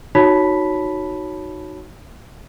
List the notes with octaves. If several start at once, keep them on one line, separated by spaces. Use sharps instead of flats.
D#4 F#4 C#5 A5 B5 B6